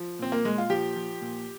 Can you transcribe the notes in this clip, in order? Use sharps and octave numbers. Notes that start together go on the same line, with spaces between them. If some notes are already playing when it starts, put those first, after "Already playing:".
Already playing: F3
A#2 C4
A#3
A#2 G#3
F4
F3 G4
F3
A#2